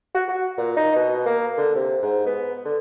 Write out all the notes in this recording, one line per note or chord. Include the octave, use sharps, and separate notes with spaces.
F#4
F#4
A#2
D#4
B2
A#3
D3
C3
G#2
B3
D3